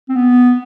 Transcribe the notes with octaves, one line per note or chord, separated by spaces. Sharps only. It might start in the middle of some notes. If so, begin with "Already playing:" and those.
C4
B3